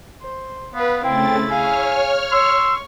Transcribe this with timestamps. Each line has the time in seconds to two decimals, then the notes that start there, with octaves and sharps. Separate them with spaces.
0.21 C5
0.74 B3 B4 F5
1.04 C#3 A3 C4 E4 G5 A6
1.50 G#4 C#5 F5 G#5 F6
2.32 C6 C#6 E6